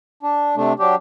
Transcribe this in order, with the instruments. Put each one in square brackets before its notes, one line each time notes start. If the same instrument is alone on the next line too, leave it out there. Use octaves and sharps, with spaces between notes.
[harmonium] D4
C3 A3 D4
F#3 D4 G4